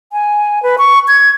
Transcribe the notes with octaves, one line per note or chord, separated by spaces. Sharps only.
G#5
B4
C#6
G#6